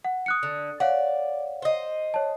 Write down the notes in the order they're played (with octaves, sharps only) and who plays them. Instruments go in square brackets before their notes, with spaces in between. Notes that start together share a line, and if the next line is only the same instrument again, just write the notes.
[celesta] F#5
D#6 F#6 C#7
[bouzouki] D3
[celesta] C#5 F5 F#5 [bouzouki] D5
[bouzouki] C5 D#5
[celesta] C#5 A5